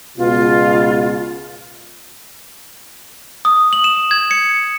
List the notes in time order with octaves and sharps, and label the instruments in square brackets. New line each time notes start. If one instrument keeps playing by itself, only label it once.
[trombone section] C#2 B2 [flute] F4
[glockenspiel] D#6
F#7
E7
G#6
C#7